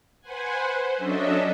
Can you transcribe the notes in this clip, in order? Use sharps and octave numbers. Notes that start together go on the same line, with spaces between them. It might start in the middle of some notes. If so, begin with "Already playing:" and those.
B4 C5 F#5 G#5
C5
F#3 C#4 D4 A4 D#5 E5